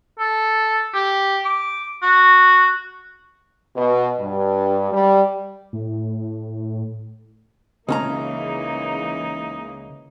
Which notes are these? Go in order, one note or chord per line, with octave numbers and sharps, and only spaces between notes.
A4
G4
D6
F#4
B2
G2
G3
A2
C#2 C#3 E3 A#3 C#4 D#4 A#5